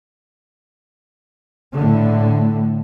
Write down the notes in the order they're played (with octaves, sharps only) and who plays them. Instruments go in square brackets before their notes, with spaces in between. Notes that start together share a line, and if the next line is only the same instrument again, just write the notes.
[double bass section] A2 D3